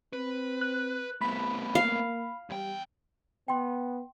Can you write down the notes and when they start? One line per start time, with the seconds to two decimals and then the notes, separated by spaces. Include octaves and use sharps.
0.13 C4 B4
0.61 F#6
1.21 C2 A3 B3 B5
1.75 A#3 F5
2.50 E2 G3 G5
3.48 B3 G5 C6